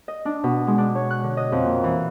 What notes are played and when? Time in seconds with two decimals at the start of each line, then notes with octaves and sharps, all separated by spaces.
0.08 D#5
0.25 D4
0.44 B2
0.67 G#3
0.78 D4
0.95 C#5
1.11 F#6
1.23 D3
1.37 D#5
1.52 F2
1.65 A#2
1.84 E3